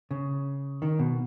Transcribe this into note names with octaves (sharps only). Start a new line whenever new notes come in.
C#3
D#3
B2